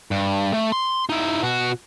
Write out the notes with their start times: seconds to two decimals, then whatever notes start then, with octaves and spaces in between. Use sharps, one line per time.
0.11 G2
0.54 A3
0.72 C6
1.09 D#4 E4
1.43 B2 F#4